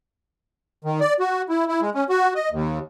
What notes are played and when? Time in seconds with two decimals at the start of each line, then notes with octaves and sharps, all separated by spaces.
0.84 D#3
1.00 D5
1.20 F#4
1.49 E4
1.68 E4
1.81 G#3
1.94 C#4
2.09 F#4
2.35 D#5
2.52 D#2